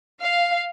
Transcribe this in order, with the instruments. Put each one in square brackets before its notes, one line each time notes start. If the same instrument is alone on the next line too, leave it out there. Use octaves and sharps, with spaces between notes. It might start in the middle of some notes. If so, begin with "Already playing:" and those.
[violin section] F5